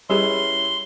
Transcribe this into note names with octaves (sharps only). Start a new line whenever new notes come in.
G3 C#4 E4 G4 G#4 B4 C6